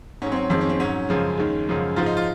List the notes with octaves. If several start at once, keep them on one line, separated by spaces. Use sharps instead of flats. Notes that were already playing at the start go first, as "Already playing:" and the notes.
G#2 F#3 C#4
C4
C#4
F2 D#3 G#3 C4
C#4
C4
G#2 F#3 C#4
F#2 C#3 F3 G#3
D#2 D#3 G#3
F#2 C#3 F3 G#3
G#2 F3 G#3 F4
D#4
F4